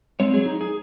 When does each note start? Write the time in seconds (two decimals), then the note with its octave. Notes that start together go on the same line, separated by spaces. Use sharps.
0.20 G#3 C4 C#5
0.34 F#3 G#4
0.46 D#4
0.61 G#4